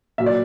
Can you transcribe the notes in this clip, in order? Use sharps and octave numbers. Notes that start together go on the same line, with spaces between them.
A#2 F#3 A#3 E5
D5